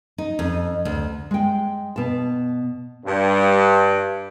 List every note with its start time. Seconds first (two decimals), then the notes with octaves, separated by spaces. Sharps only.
0.18 D#4
0.39 F2
0.85 D2
1.31 G#3 G5
1.96 B2 A5
3.06 G2